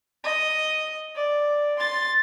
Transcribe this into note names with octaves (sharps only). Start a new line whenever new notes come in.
D#5
D5
C6 A6